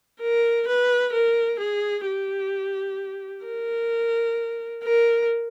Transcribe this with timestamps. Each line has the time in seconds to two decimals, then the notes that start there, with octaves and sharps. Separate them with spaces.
0.21 A#4
0.68 B4
1.13 A#4
1.60 G#4
2.06 G4
3.45 A#4
4.83 A#4